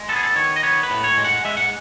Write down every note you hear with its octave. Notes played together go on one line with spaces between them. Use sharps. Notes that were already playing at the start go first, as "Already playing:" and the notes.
Already playing: G#3
B3 A4
G#4
A4
D#3 C#5
D#5
B3 C#5
B4
A2
C#5
G#3
F#5
G#3 E5
F#5